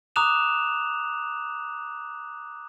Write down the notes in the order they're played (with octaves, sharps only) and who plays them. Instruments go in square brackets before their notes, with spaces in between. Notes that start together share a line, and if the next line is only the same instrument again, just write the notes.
[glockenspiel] A#5 D6 D#6 F#6 E7 F7